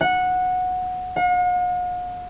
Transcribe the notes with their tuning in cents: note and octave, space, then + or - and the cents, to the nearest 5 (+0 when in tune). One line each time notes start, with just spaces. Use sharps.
F#5 -15
F#5 -45